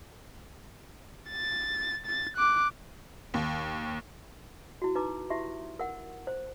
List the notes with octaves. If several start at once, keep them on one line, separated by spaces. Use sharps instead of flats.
A6
A6
D6 F#6
D#2
E4 F#4
D#4 B4 A#5 D6
E4 G4 E5 C6
A#4 F#5
C5